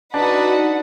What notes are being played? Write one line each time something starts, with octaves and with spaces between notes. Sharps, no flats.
D4 D#4 F#4 B4 D#5 F#5